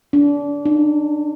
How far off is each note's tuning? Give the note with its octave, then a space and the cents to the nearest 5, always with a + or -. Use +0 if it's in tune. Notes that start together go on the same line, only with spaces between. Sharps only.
D4 -30
D4 +45